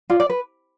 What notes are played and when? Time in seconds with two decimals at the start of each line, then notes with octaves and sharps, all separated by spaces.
0.10 F4 D5
0.20 D5
0.30 B4